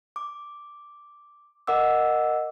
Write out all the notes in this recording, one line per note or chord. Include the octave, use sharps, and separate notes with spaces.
D6
A#4 D#5 F#5 D6 E6